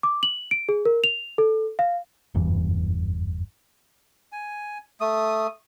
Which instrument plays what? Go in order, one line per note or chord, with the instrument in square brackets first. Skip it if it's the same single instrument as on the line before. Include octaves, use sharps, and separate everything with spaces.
[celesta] D6
F#7
D7
G#4
A#4
F7
A4
F5
[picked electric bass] F#1 E2 G2 E3
[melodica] G#5
A3 D#6